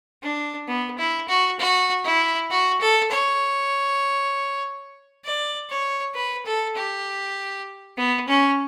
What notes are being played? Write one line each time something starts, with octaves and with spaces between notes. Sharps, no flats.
D4
B3
E4
F#4
F#4
E4
F#4
A4
C#5
D5
C#5
B4
A4
G4
B3
C#4